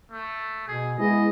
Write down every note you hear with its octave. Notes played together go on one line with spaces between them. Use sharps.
A3
B2 G#4
G#3 B3 E4 G#4 D#5